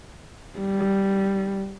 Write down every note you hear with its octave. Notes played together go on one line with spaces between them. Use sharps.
G3